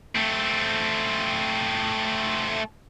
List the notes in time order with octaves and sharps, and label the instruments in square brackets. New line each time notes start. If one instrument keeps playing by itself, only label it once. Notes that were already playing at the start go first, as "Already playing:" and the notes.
[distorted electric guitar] A3 C4